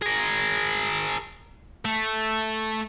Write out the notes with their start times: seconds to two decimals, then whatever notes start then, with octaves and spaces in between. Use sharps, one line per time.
0.02 G#4 A#4
1.85 A3